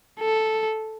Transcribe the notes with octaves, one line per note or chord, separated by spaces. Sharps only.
A4